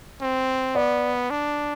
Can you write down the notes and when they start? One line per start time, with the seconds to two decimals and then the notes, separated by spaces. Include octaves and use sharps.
0.21 C4
0.75 B3 D5
1.30 D4